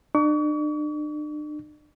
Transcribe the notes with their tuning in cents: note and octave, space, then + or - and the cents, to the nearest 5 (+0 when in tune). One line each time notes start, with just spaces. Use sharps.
D4 +40 C#6 +45